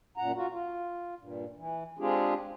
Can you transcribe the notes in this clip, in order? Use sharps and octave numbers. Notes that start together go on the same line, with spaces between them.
F#2 A#2 F#5 A#5
F4 F#4
F4
G2 A#2
E3
G#3 C4 D4 F4 G4 G#4